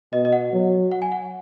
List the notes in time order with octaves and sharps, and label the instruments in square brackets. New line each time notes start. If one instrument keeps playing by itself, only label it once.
[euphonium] B2 [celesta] D#5
[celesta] D#5
F#5
[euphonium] F#3
[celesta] F#5
G#5
F#5